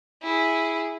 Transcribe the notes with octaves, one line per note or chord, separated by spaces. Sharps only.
E4 G#4